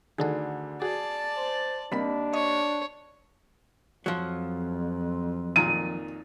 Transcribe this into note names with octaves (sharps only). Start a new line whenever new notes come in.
D2 D3 D#3 D#4 G#4 A4
F#4 G#4 D5 A5
C5
D#2 G3 C4 D4 A#4 B5 B6
C#5 D#5
F2 F3 F#3
G#1 A#2 D#3 D#7